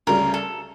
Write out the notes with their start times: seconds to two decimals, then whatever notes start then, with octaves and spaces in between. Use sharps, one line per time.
0.07 D2 C#3 G3 A#4
0.34 A4